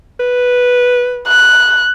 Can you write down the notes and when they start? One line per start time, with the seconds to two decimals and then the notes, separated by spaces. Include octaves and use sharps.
0.20 B4
1.27 F#6